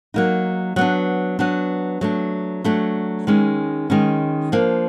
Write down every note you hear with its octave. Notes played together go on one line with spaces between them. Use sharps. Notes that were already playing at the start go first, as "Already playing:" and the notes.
F#3 A#3 D#4
F#3 B3 D4
F#3 B3 D4
F#3 A3 D4
F#3 A3 D4
D#3 G#3 C#4
D#3 G#3 C#4
F3 A#3 D4